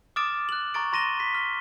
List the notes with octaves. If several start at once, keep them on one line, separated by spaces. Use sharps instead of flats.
D6 D#6 F6 A6 D7 E7
F#6 F#7
A#5 C#6 A6 D7
A#5 C6 A#6 D#7 E7 G7
B6
F6 G7